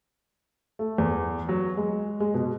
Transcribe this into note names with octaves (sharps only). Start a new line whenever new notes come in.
A3
E2
F#3
G#3
G#3
B2